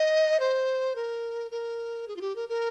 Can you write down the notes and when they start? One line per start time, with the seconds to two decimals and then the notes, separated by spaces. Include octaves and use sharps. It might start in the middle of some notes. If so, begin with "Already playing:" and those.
Already playing: D#5
0.40 C5
0.96 A#4
1.51 A#4
2.08 G#4
2.16 F4
2.21 G4
2.36 A#4
2.49 A#4